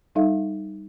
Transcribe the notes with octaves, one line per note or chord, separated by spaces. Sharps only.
G3 D#4 A4 E5 F5